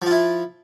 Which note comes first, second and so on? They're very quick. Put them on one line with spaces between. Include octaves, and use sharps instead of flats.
F3 F4 E4